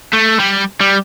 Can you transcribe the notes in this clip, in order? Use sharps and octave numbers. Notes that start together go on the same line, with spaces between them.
A3
G3
G3